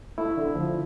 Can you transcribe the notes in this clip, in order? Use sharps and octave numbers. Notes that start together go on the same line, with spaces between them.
A3 E4
D3
F3